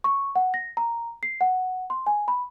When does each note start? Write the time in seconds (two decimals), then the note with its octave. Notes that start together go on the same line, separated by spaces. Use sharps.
0.04 C#6
0.36 F#5
0.54 A#6
0.77 A#5
1.23 C7
1.41 F#5
1.90 C6
2.07 G#5
2.28 B5